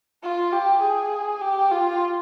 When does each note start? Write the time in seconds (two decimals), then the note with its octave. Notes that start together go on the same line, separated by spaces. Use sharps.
0.23 F4
0.52 G4
0.81 G#4
1.41 G4
1.71 F4